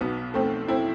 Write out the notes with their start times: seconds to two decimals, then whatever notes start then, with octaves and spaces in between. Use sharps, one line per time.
0.01 B1 B2 B3
0.34 A3 C4
0.68 C4 E4